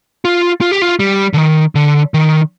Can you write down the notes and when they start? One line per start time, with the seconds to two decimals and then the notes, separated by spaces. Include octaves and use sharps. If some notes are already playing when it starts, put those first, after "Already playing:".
0.25 F4
0.61 F4
0.72 G4
0.82 F4
1.00 G3
1.33 D3
1.37 D#3
1.75 D3
2.14 D#3